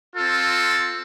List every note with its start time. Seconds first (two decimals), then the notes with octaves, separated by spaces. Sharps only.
0.16 C4 F4 A4